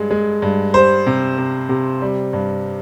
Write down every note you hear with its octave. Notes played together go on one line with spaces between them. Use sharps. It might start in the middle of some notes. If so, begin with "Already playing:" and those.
Already playing: G2 G#3
G#3
G2
G3 C5
C3
C3
C3
G3
G2